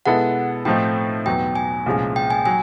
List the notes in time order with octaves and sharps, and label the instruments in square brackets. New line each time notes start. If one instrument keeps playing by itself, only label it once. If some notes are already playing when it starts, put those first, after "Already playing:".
[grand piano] B2 G#3 B3 E4 A4 [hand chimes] F#5
[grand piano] A2 F3 A3 C4 D#4 [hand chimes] G5
[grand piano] E2 B2 F#3 B3 [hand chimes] G5
[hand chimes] G#5
[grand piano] C2 A#2 F3 G#3 C#4
[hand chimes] G5
G#5
[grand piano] F#3 [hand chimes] G#5